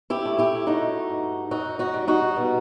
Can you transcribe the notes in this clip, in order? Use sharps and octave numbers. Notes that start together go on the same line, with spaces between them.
E4 G4
A3
E4 G4
A3 D#4 F#4
G2
F#2 D#4 F#4
D#4 F#4
G3
D#4 F#4
B2